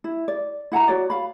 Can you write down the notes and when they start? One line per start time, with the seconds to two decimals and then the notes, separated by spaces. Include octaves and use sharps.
0.04 E4
0.28 D5
0.72 E4 F#5 A5 A#5
0.88 F#4 C#5 D5
1.10 F5 B5